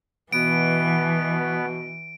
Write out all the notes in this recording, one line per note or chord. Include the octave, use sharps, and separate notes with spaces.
B2 E3 B3 D7